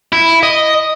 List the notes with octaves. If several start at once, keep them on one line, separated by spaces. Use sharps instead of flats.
E4
D#5